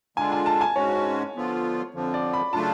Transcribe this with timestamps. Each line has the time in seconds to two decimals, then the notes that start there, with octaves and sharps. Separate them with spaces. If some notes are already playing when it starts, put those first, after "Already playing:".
0.17 D3 G#3 D4 F4 G#5
0.32 G#5
0.46 A5
0.61 G#5
0.76 G#2 G#3 C#4 F#4 C#5
1.35 D3 F3 B3 F4
1.94 F2 D3 F3
2.14 D5
2.33 B5
2.53 C#3 F#3 A3 D4 F4 A5